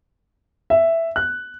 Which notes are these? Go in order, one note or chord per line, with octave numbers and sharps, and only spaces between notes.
E5
F#6